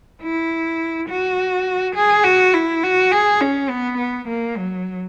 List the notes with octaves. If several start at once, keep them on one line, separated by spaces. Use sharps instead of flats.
E4
F#4
G#4
F#4
E4
F#4
G#4
C#4
B3
B3
A#3
F#3